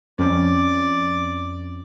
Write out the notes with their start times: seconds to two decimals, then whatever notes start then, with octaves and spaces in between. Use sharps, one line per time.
0.19 F2 C#4 D5